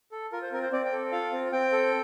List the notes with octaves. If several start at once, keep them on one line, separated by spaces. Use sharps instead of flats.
A4
F4 A#4
C5
C4 A#4
C5
C4 D5
G5
A4
F4 F5
C4
C4 G5
A4